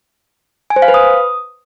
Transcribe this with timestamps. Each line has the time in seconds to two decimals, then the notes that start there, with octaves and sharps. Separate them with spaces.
0.70 G#5
0.76 C5
0.82 F5
0.88 B4
0.94 D#6